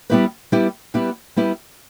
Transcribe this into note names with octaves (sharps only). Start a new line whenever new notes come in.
G3 B3 E4 G4 B4
G3 B3 E4 G4 B4
G3 B3 E4 G4 B4
G3 B3 E4 G4 B4